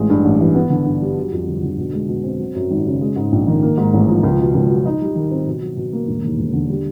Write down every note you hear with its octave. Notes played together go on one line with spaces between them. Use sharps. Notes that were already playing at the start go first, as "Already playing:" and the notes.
Already playing: A1 G#3
G2
A1
E3
B3
D3
G2
G3
F#3
F2
G1
D3
B2
G#3
B2
C4
F#3
F#2
G#1
C#3
G#3
G#2
A#1
D#3
A#3
G#2
A1
F3
C#2
B2
C#2
F#3
D#4
G3
D#3
C4
B2
F#3
B2
A#3
E1
D#2
E1
D3
G3